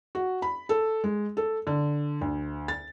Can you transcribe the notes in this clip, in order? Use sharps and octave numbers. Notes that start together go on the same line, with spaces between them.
F#4
B5
A4
G#3
A4
D3
D2
A6